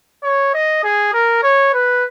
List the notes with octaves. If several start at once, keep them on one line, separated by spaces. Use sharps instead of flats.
C#5
D#5
G#4
A#4
C#5
B4